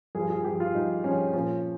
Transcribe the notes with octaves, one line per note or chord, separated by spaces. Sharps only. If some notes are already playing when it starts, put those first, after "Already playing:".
G2 F3 G#4
G#4
G2 F3 G4
F4
G2 F3 D#4
G2 F3 C#4
A#2 F3 C#4